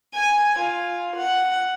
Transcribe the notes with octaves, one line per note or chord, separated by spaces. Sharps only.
G#5
F4
F#5